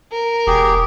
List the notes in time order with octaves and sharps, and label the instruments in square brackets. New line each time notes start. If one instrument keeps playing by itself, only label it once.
[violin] A#4
[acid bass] E1 [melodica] G4 G#4